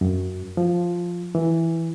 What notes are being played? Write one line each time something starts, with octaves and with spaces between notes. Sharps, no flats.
F#2
F3
E3